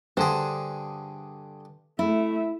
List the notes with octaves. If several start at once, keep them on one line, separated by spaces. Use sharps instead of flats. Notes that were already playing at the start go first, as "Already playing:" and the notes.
G2 D3 G#4 C5
A3 E4 E5